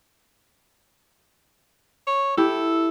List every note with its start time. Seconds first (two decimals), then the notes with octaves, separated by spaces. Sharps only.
2.07 C#5
2.37 E4 G4 A4